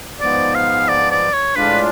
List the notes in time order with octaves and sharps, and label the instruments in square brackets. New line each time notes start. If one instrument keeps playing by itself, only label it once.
[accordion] G#2 F3 B3 [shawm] D5
[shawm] F5
D5
D5
C#5
[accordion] A2 G#3 D4 F4 [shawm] B4